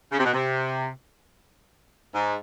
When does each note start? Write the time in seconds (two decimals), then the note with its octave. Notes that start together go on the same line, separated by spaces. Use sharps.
0.12 C#3
0.19 C3
0.25 B2
0.34 C3
2.15 G#2